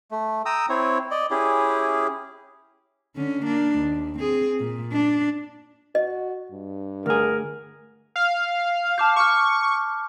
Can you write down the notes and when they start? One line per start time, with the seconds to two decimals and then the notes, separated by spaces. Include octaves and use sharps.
0.11 A3
0.46 G5 A#5 D#6 E6
0.69 C4 E4 C#5
1.11 D5 D#5
1.31 C#4 E4 G4 G#4
3.16 D3 C#4
3.44 A#3 D4
3.79 D#2
4.19 C4 G#4
4.60 A#2
4.93 D4
5.95 F#4 D#5
6.52 G2
7.06 D2 G#4 A#4
8.16 F5
8.98 A5 D6 G6
9.16 C#6 D6 F6